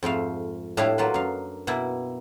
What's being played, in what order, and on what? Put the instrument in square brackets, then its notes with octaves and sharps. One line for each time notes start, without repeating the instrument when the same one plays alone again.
[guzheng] F2 G#2 A3 F5
A2 D4 E4 G4 F5
F#3 A#3 F4 B4
F#2 F5
B2 A#3 E4